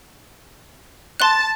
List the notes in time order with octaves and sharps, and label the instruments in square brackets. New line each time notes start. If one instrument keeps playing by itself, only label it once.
[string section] A5 [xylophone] C6 F#6